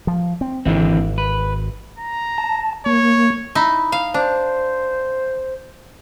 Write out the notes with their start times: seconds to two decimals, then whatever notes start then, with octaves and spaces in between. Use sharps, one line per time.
0.07 F3
0.41 C4
0.66 G#1 D3 E3 C4
1.18 B4
1.99 A#5
2.38 A5
2.86 A#3 C#5
3.55 D#4 E4
3.92 F5
4.14 D4 C5